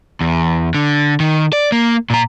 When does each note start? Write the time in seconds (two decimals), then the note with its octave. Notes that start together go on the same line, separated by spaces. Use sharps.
0.21 E2
0.75 D3
1.20 D#3
1.53 D5
1.72 A#3
2.10 A#2 A#5